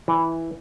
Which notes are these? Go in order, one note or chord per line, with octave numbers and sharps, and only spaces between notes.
E3